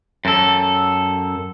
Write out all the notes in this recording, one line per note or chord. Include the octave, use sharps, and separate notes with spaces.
F#2 A4